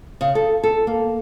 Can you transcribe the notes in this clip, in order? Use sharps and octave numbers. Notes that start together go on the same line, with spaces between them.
C#3
A4
A4
A#3